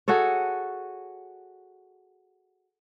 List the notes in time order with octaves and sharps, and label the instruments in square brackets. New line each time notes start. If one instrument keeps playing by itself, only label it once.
[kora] F#4 G#4 A4 C#5